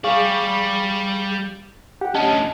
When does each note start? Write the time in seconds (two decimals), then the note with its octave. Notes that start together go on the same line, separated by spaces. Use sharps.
0.04 G3 G#4 D5 F5 C#6
2.01 G4 F#5
2.15 D2 C#4 D#5 A5